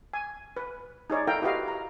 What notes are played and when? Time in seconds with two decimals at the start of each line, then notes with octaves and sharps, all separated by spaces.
0.13 G#5
0.57 B4
1.10 D#4 G#4 C#5 D5
1.27 E4 A4 A#4 F5 G5 A#5
1.42 E4 F#4 G4 B4 D#5 F5
1.68 A#5